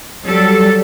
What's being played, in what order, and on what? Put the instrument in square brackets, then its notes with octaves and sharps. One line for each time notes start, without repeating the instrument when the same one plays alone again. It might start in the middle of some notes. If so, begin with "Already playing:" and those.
[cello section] F#3 G3 A4